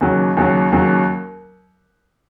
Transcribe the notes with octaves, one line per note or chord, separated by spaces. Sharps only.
D#2 C#3 F#3
D#2 C#3 F#3
D#2 C#3 F#3